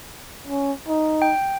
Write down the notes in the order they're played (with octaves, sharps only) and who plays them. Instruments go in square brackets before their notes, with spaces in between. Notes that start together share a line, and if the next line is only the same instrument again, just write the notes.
[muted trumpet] C#4
D#4
[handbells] G5